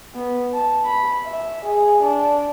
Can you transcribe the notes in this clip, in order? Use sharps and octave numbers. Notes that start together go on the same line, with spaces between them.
B3
A5
B5
E5
G#4
D4